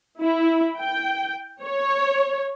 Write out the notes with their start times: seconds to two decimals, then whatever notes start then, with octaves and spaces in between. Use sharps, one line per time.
0.21 E4
0.79 G5
1.63 C#5